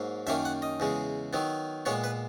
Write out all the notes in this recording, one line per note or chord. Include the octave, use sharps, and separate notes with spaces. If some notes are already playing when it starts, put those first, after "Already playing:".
Already playing: G#2 F#3 A#3
F#2 D#3 A#3 C#4 E5
F#5
D#5
E2 C#3 G#3
D#3 F#3 B3
A#2 G#3 B3 C#5
B4